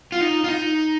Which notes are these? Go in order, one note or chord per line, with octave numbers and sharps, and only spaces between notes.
F4
D#4
F4
D#4